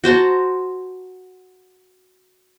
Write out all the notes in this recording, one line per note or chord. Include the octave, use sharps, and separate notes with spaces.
F#4 C5 A5 A#5